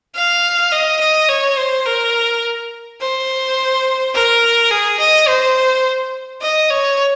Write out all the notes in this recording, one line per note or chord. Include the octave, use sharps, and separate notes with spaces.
F5
D#5
D#5
C#5
C5
A#4
C5
A#4
G#4
D#5
C5
D#5
C#5